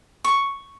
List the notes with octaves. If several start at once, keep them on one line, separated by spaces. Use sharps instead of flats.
C#6